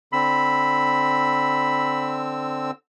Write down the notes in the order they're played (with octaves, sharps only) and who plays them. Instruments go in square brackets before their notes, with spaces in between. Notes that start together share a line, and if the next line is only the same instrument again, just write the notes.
[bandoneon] D3 C4 E6 [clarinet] B5